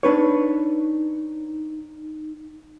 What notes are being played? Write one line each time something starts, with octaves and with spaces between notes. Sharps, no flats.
D4 D#4 B4 C#5